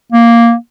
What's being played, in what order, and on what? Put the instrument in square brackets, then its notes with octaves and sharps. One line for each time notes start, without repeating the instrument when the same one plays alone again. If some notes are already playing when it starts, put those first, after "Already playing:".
[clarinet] A#3